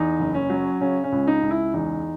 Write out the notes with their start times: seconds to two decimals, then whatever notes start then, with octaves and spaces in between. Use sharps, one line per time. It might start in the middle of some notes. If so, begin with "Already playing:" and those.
Already playing: E2 D#4
0.20 F#1
0.34 C#4
0.50 F#3
0.80 C#3 C#4
1.04 C#4
1.12 C#2
1.27 D#4
1.43 C#2
1.51 E4
1.74 E2 D#4